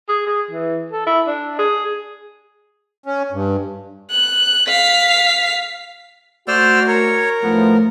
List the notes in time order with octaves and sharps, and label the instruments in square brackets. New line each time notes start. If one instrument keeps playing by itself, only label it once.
[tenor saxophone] G#4
G#4
E3
A4
E4
D4
G#4
[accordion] C#4
G2
[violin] F#6
F5 B6
[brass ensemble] A3 F#4 [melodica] C5 D5 E6 [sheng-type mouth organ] C6 F6
[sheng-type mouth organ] A#4 [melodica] C#5
[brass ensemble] B1 A2 F3 [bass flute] A3 [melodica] B3